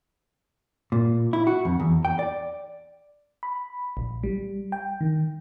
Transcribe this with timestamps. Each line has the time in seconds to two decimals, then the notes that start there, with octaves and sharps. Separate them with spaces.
0.92 A#2
1.33 E4
1.47 F#4
1.65 F2
1.80 E2
2.05 G5
2.19 D5
3.43 B5
3.97 A#1
4.23 G3
4.72 G5
5.01 D#3